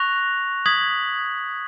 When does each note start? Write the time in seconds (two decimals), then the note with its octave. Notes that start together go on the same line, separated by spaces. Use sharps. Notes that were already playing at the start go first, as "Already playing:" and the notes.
Already playing: C#6 F#6 A#6 F7
0.66 D#6 G#6 B6 F#7